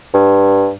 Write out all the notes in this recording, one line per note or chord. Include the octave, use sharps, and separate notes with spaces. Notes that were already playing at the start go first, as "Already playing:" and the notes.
G2